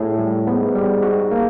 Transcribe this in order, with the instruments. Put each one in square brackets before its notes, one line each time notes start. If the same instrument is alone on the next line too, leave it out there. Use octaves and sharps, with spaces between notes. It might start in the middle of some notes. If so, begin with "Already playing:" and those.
Already playing: [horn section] A2 [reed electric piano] G#4
[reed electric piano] G3
[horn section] G#2 [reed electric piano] B3
[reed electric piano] G3
F#4
A#3